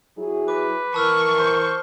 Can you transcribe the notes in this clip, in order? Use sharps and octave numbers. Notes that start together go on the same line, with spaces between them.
F#3 E4 G#4
B4 D6
E3 A#4 A5 C#6 E6 F6
C5